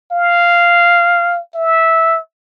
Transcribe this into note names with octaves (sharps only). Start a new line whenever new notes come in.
F5
E5